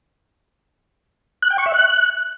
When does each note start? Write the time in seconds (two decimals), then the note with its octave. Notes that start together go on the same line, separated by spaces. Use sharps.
1.42 F#6
1.50 G5
1.58 C#6
1.66 E5
1.74 F#6